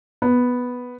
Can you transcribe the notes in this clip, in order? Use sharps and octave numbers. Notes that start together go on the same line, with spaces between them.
B3